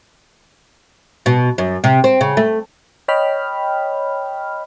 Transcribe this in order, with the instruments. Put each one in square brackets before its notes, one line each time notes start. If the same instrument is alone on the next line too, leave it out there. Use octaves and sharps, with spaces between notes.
[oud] B2
F#2
C3
C4
C#3
A3
[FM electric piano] C#5 D#5 G5 B5 F6